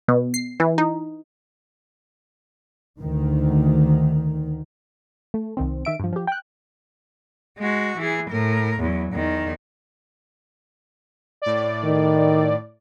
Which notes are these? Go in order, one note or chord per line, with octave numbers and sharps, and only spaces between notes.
B2
C7
E3
D#4
D2 D#3
A3
C2 D#3 C4
D#3 E5 D7
G2 F3
F3 G4
G5 F#6
G#3 F#4
E3 G#4
A2 A#4
E2 F#3
E2 D#3
A2 D5
D#3